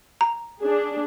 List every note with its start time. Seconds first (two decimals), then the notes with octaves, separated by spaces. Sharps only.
0.21 A#5
0.61 D4 G#4